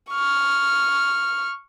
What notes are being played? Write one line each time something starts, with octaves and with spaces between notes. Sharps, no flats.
C#6 F6